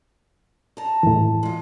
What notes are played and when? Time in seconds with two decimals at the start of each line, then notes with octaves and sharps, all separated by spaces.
0.77 A5 A#5
1.03 E2 A2
1.43 G#3 F4